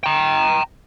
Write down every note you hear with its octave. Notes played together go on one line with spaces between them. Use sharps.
G5 A#5